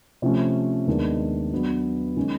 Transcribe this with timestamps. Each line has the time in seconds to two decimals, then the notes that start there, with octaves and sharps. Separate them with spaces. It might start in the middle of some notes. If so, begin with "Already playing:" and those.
0.22 C3 F3 A3 C#4
0.87 D#2 D#3 G#3 B3 D4
1.51 F#3 B3 D4 F#4 B4
2.16 D#3 G#3 C#4